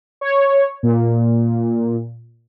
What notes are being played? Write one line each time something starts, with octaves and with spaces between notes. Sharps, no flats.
C#5
A#2